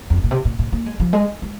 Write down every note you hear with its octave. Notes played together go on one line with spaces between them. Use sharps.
F2
G#2
A#2
C3
A#2
A#2
A#3
G#3
F3
G#3
G#3